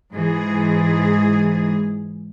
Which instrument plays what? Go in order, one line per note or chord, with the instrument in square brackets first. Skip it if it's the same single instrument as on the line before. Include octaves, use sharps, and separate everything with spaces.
[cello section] G#2 E3 G#4